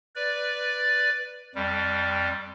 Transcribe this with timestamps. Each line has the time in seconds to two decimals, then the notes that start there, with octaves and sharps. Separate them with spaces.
0.16 B4 D5
1.55 F2 G3